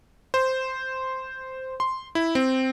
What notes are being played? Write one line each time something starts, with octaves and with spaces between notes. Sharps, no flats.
C5
C6
E4
C4